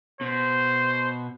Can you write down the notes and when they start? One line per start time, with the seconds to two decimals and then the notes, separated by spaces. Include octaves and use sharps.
0.21 B2 C5